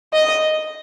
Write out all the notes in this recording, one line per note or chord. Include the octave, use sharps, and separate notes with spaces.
D#5